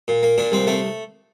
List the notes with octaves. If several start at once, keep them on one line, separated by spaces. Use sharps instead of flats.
A#2
A#3
A#2 D4
C2 C4
A3 C4